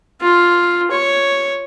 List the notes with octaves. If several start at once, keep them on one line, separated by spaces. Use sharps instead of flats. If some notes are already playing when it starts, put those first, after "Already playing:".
F4
C#5